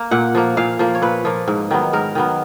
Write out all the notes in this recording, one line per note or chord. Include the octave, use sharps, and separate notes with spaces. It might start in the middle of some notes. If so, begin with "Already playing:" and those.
Already playing: A#3
A#2 F#5
F3 A#3
A#2 F5
F3 A#3
C#5
A#2 B4
F3 A#3
G#2
D#3 F#3 B3
G#2 A#4
D#3 F#3 B3